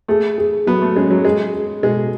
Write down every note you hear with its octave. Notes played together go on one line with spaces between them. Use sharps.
A3 G#4
G#4
F#3 B3
A3
G#3 C#4
F#3
G#3 G#4
G#4
B2 G#3